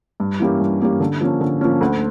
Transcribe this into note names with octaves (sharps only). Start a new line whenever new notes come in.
G2
E3 A#3 C#4 G4
G2
E3 A#3 C#4 G4
D3
F3 A#3 C#4
D3
F3 A#3 C#4
D2